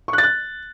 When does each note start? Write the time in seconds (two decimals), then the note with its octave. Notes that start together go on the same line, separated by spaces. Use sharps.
0.08 C#6
0.13 F#6
0.18 A6
0.23 F#6